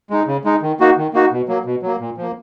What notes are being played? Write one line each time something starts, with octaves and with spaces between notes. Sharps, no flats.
G#3 D#4
C#3
G#3 D#4
D#3
A#3 D#4 F#4
D#3
A#3 D#4 F#4
B2
F#3 A#3
B2
F#3 A#3
A#2
F3 A#3